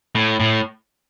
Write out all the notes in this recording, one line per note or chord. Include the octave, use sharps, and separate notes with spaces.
A2
A2